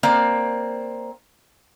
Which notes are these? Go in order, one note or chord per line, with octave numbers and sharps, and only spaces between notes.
A#3 C4 D5